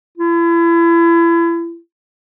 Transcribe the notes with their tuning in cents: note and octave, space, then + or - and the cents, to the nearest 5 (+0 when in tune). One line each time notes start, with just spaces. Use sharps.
E4 +35